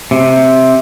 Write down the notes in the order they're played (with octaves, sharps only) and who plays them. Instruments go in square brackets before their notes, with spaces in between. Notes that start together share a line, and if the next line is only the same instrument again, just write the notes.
[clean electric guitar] C3